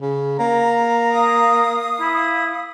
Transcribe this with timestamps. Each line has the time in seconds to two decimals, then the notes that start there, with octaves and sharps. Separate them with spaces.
0.01 C#3
0.39 A#3 A#5
1.09 F5 D#6
2.01 E4